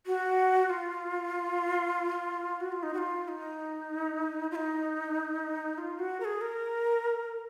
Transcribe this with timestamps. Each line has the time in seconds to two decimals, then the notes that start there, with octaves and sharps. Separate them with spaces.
0.06 F#4
0.70 F4
2.60 F#4
2.72 F4
2.83 D#4
2.94 F#4
2.98 F4
3.24 F4
3.28 D#4
4.51 F4
4.56 D#4
5.78 F4
5.99 F#4
6.20 A#4
6.25 G#4
6.41 A#4